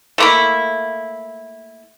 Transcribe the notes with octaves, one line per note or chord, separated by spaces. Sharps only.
A3 A#3 E4